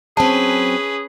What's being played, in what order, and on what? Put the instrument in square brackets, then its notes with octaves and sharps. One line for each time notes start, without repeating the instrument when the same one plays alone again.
[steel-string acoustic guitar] F#3 C4 [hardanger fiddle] C#4 B4 [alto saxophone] G#4 [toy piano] A5